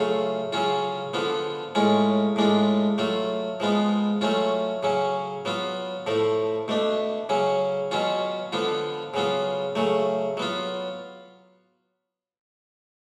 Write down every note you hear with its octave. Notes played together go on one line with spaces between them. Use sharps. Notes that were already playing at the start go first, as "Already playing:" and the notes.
Already playing: C#3 F#3 A3 F4
C#3 F#3 C#4 F4
D3 F3 B3 F4
A2 G#3 C#4 F4
A2 G#3 D4 F4
F#3 A3 F4
F3 G#3 B3 F4
F#3 A3 C#4 F4
C#3 F#3 C#4
F#3 B3 F4
A2 F3 A3
B2 A3 D4
C#3 F#3 C#4
B2 F#3 C#4 F4
D3 F3 B3 F4
C#3 F#3 B3 F4
C#3 F#3 A3
F#3 B3 F4